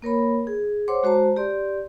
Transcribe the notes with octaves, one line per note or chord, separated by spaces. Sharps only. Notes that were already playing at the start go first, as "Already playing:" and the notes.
A#3 A#4 C#5 B5
G#4
C5 C#5 F#5 C6 D6
G#3 F#4 C5 A5 A#5
G4 D5 C6